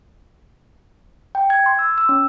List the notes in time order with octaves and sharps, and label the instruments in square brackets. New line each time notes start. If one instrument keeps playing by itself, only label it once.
[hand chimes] G5
G#6
C6
E6
E6
C#4